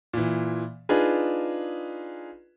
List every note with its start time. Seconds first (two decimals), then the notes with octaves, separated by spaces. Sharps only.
0.13 A#2 E3
0.89 D4 D#4 F4 G#4 B4